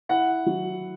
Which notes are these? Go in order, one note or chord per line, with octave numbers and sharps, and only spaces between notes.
E4 F#5
F#3